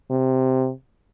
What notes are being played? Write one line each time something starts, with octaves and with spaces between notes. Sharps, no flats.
C3